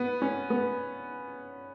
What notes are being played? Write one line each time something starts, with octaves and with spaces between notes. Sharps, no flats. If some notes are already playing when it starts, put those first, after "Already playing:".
Already playing: B3
C#4
B3